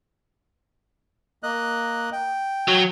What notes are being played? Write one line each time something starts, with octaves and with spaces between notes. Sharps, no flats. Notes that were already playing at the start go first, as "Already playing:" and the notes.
A#3 D#5 F#6
G5
F#3